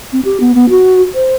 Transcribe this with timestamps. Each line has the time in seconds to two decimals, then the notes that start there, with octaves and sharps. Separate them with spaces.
0.13 C4
0.25 G4
0.40 B3
0.55 B3
0.70 F#4
1.15 C5